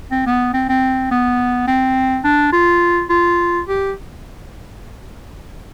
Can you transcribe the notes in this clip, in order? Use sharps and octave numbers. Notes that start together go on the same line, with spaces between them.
C4
B3
C4
C4
B3
C4
D4
F4
F4
G4